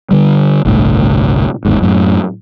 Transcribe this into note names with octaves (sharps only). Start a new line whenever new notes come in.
D3 G3
G1 C2 A2 D3
G1 D#2 G#2
F#2 A2